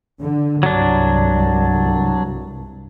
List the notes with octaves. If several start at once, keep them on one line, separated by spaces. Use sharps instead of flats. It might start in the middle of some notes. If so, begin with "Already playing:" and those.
D3
C2 G2 F#3 D4